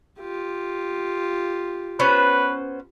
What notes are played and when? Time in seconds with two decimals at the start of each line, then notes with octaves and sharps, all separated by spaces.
0.20 F4 G4
2.00 B3 C#4 B4 C5